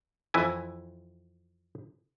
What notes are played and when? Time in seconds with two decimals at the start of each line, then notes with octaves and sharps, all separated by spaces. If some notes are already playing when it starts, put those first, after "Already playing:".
0.34 F2 E3 E4 G#5